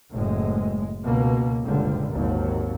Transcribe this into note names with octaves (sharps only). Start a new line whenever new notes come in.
F#1 A2 G#3
C#2 B2 A#3
F#1 C#2 A#2 D3 G3
G#1 D#2 F#3